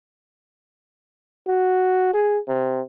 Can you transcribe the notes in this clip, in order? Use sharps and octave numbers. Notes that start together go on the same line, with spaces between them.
F#4
G#4
C3